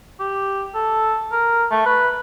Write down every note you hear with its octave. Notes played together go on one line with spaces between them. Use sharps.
G4
A4
A#4
A3
B4